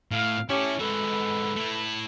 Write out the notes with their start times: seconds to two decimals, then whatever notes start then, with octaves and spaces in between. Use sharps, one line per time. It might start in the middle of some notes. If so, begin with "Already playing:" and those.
0.11 A2 F5
0.50 C#4 E4 G4 A4
0.80 G#2 F#4 A4 B4
1.56 A3 E4